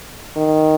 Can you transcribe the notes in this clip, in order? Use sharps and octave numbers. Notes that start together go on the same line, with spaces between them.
D#3